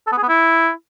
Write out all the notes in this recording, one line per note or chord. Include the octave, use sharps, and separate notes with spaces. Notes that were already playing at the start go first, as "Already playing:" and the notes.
A4
B3
G#4
B3
E4